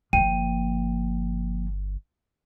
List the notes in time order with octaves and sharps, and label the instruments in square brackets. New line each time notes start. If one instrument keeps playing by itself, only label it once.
[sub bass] G1 [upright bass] F3 A#3 [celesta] G5 D#7